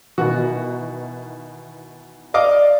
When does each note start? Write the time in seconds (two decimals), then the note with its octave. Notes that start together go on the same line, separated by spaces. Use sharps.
0.18 B2 D#3 E3 F#4
2.34 D5 D#5 F5 D6